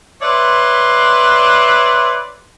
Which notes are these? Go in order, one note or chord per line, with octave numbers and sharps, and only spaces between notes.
B4 C#5 D5 E5 C6